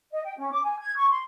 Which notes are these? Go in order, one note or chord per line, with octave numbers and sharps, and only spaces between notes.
D#5
G5
C#4
D6
G#5
G#6
C#6
C6